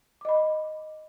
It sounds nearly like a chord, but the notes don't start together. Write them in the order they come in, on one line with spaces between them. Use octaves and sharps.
D6 D#5 B5